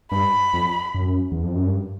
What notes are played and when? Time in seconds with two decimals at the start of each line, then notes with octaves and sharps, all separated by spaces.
0.12 G2 B5
0.53 F2
0.95 F#2
1.32 E2
1.43 F2
1.55 F#2
1.66 G2